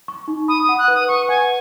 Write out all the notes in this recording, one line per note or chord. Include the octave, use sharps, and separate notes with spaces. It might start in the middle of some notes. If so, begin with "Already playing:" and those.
C#6
D#4
B5 D#6
D#6
F#5
F#6
B4
D#6
B4 C#6
F#5 G#5